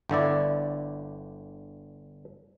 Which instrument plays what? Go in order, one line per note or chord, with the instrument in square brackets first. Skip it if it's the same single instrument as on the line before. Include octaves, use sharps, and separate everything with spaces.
[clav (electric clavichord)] G1 D3 E4 D5